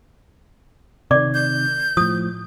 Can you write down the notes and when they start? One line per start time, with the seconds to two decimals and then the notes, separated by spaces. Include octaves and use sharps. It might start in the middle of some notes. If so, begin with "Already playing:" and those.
1.11 C3 D#3 D5 D6
1.34 G6
1.97 A2 F3 D#6